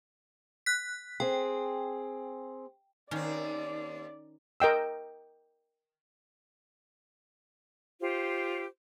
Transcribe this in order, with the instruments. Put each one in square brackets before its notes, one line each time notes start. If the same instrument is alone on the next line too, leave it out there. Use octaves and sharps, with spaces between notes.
[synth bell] F#6 B6
[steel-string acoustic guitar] C4 G#4 [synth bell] G5
[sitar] D#2 C4 [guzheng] D#3 C#4 [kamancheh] D5
[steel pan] A#4 D#5 G5 E6
[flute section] F4 G4 C5